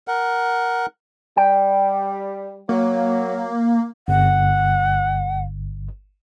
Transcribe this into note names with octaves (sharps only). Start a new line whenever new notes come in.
A#4 F#5
G3 G5
F#3 A#3
G1 F#5